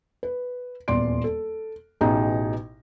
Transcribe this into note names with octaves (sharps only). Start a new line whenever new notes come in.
B4
D#1 E2 D5 C6 D7
A4
A1 B2 D#4 G#4 G5 A#5